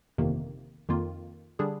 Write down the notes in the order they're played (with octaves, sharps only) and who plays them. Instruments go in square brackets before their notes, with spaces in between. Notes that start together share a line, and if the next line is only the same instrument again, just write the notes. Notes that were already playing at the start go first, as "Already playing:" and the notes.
[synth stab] G1 F2 C3 D#3 A#3
F2 D#3 A#3 F4
D3 G3 D4 G#4